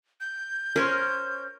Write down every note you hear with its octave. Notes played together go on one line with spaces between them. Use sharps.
G6
C#4 A#4 C5 C#5